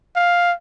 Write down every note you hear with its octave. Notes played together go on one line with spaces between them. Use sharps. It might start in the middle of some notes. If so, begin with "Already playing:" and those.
F5